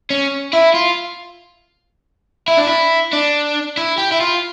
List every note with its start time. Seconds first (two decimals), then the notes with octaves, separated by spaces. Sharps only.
0.10 C#4
0.53 E4
0.74 F4
2.48 E4
2.57 D4
2.66 E4
3.13 D4
3.77 E4
3.98 G4
4.12 E4
4.21 F4